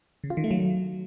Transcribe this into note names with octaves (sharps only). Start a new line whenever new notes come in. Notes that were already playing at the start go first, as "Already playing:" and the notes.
C#3
F4
D#3
A3
F#3